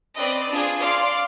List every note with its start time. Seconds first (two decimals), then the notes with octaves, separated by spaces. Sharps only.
0.17 C4 B4 D5 D#5
0.50 D4 F4 G#4
0.79 D5 F5 C6 D6